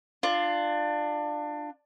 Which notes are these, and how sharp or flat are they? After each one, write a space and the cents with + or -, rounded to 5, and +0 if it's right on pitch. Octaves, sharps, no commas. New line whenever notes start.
D4 +20 F4 +0